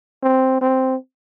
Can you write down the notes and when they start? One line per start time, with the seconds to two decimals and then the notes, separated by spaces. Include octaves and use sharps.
0.23 C4
0.61 C4